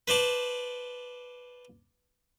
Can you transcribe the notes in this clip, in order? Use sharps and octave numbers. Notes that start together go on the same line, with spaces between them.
B4 C5 D5 A5